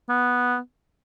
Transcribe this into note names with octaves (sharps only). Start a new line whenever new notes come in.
B3